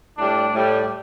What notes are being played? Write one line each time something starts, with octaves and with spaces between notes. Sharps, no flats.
A2 G3 D4
A2 G3